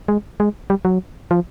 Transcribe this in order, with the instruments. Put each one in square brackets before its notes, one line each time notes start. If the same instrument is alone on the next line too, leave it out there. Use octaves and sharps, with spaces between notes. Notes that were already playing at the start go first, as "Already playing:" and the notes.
[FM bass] G#3
G#3
G3
F#3
F3